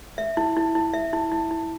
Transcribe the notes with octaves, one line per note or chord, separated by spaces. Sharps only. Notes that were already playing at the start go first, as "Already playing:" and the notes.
E5
E4
E4
E4
E5
E4
E4
E4